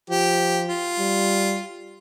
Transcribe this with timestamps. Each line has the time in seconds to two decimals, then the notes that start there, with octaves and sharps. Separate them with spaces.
0.09 F3 G4
0.68 F4
0.98 G3